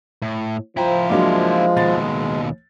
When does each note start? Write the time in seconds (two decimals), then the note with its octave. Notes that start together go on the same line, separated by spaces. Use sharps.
0.22 A2
0.77 F3 E4 C5 G5 A#5
1.09 F#3 G#3 A#3 D4
1.77 D#2 B2 A6